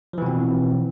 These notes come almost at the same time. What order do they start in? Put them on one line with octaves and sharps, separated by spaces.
F3 E3 B2 C4